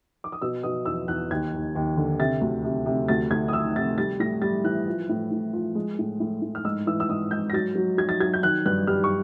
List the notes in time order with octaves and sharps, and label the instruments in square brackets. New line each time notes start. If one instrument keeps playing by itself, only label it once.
[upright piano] D6
D#6
B2 E6
B2 D#6
E2 E6
E2 F#6
D#2 G#6
D#2
D#2
D3
C3 A6
D2
C3
C3
D2 A6
D2 G#6
D#6
D#3 E6
C3 A6
G3 A6
A2 A#6
G3 A6
E3 F#6
F3
A2
A2
F3
G#3
A2
A2
A2
F6
G#2 E6
E3 E6
E6
G#2 D#6
G#2 G6
A#6
F#3 A6
F#3
F#3 G#6
A6
F#3 G#6
G6
D#3 F#6
G2 F#6
G3 F6
C#6